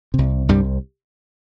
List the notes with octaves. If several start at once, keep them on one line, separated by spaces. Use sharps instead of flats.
C2 C3
C2 G2 C3 G3